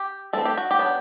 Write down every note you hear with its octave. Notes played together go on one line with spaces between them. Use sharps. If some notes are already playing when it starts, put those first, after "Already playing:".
Already playing: G4
E3 A3 C4 A4
G4
F#4
G4
F#3 B3 D4